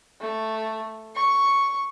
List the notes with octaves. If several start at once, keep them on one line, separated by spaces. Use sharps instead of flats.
A3
C#6